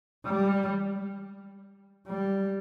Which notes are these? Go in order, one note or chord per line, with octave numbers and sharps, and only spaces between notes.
G3
G3